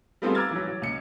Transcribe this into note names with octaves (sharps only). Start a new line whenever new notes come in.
G3 A3 B3 C4 F4 G#4
A#5 D6 E6 F6 G#6 A6
E3 F#3
F#3
C#2 C#7